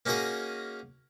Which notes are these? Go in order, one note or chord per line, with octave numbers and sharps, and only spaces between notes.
A#3 C#4 D#4 F#4 G#4 A#4